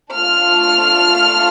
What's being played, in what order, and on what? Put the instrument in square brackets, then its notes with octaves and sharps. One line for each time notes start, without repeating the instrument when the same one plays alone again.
[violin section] A3 D4 F4 A4 F6